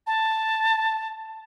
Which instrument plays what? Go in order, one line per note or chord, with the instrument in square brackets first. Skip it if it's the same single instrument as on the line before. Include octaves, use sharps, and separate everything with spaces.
[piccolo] A5